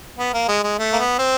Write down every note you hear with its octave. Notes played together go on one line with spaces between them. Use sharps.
B3
A#3
G#3
G#3
A3
A#3
B3
C4